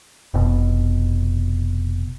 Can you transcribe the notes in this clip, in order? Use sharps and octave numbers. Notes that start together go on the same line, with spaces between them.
F1 B2